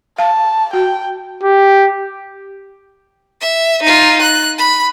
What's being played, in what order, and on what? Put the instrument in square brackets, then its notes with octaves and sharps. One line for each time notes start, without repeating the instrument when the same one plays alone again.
[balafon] F5 [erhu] A5
[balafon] F#4 [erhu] G5
[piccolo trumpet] G4
[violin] E5
D#4 F4
F#6
B5